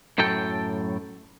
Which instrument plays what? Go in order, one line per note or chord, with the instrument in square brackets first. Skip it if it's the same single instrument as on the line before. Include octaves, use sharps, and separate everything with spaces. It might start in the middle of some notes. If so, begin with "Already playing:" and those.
[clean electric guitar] F#2 A2 F#3 A4 G5